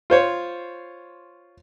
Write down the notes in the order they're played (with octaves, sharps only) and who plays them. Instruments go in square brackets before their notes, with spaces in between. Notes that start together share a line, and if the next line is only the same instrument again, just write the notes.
[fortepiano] F4 C5 C#5